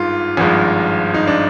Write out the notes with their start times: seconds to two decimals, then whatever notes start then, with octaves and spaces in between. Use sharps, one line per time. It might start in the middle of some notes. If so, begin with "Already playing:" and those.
Already playing: G#1 G2 D#3 G#3 F4
0.37 G#1 G2 F3 G#3
1.14 D#4
1.27 D4